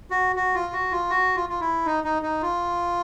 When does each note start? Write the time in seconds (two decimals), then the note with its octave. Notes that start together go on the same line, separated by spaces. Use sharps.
0.11 F#4
0.36 F#4
0.55 F4
0.73 F#4
0.92 F4
1.10 F#4
1.36 F4
1.49 F4
1.60 E4
1.86 D#4
2.04 D#4
2.23 D#4
2.42 F4